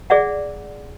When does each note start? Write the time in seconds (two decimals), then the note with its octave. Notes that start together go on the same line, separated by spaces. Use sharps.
0.10 G#4 D5 E5 F#5